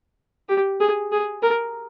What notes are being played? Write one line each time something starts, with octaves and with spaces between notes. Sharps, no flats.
G4
G#4
G#4
A#4